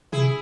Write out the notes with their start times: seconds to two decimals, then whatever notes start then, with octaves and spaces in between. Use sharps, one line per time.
0.12 C3 E4 G#4